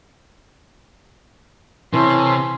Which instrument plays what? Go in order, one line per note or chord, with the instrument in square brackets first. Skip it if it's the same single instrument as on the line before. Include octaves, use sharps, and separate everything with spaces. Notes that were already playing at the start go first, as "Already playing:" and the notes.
[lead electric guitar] C3 [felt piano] E3 [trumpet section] C#4 A4 [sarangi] C6